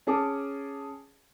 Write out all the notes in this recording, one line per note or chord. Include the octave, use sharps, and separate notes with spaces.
C#4 G#4 A5 D6